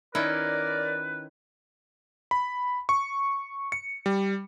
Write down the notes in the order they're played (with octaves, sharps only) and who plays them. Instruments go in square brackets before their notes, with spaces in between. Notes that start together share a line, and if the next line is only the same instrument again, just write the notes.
[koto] D#3 C#4 E4 [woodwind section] A#4 D5 [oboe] B4
[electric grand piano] B5
C#6
C#7
G3